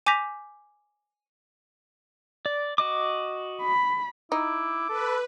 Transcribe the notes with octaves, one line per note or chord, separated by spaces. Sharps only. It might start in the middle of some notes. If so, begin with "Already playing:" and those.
G#5 D6 G6 A#6 B6 F7
D5
F#4 D#5 D6
B5
D#4 E4 D6
A4 B4